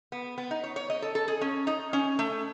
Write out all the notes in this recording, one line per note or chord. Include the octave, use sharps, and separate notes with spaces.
B3
B3
D#4
C#5
C#5
D#5
A4
A4
G#4
C#4
D#4
C#4
A3